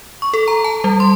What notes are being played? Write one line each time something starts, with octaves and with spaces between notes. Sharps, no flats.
C#6
A4
A#5
A5
G3
C6